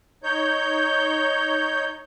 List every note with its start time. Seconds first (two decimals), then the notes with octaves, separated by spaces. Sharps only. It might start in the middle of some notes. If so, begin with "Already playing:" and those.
0.23 D#4 C#5 G6